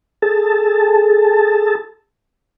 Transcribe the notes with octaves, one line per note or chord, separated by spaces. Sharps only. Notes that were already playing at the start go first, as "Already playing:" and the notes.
G#4 A4 A5